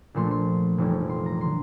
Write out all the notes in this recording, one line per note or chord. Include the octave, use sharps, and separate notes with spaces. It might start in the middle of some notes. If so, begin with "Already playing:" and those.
A#1 A#2 F3 A3 C6
C6
F1 F2 E3 G3
C6
A#5
D3 C6